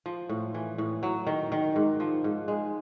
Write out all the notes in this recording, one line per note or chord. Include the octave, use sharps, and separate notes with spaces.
F3
A2
E3
A2
F#3
D#3
D#3
G#2
F3
G#2
G#3